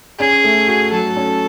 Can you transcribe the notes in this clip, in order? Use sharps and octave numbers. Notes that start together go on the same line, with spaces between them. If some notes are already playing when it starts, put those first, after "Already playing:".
C#4 G#4
A3
F#4
F#3 A4
C#4